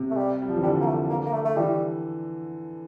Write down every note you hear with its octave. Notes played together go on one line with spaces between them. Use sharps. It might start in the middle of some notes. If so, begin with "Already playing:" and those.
Already playing: C3
A3
G3
G3
F3
E3
D3 G3
A#3
A3
A#3
A#3
A3
A3
E3 G3